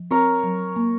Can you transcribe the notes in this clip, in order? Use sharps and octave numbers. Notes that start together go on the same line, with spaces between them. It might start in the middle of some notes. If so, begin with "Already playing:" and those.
Already playing: F3
C4 A#4 C#5
F#3
A#3